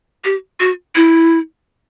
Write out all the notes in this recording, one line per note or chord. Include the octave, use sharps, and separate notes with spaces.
G4
F#4
E4